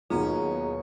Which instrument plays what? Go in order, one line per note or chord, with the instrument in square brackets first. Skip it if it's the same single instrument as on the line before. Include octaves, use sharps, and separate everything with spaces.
[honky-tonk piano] D#2 B2 F#3 [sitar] C#4 [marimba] D#4 F4 [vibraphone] G#4 A#5